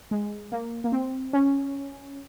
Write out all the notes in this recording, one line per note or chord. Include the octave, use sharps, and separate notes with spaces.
G#3
A#3
A#3
C4
C#4